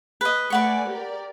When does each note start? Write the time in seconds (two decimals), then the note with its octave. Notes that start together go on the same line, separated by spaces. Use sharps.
0.21 B4 D#5
0.50 A3 B4 D5 F#5 G#5 C#6
0.89 G4 A#4 D5